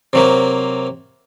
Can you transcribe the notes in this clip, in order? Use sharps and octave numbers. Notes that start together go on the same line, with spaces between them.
C3 F#3 A#3